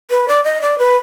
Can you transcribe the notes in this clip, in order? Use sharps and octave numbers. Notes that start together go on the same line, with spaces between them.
B4
D5
D#5
D5
B4